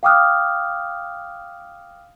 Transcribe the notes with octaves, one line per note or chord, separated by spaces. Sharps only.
F5 G5 D6 D#6 F6 F#6